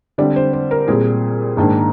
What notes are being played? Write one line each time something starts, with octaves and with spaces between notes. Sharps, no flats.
D3 G3 C4 D5
C5
C5
A#4
A#2 G3 C4 G#4
G#2 D#3 A#3 D4